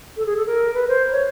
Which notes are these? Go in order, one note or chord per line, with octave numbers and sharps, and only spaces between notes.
A4
G#4
A4
A#4
B4
C5
C#5